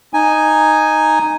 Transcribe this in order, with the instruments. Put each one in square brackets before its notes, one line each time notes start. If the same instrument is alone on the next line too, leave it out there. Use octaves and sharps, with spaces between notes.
[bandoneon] D#4 G#5